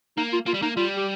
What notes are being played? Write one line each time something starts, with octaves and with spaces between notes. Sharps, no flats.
A#3 D#4
F4
A#3 F4
G3
A#3 D#4
G3 F4
G4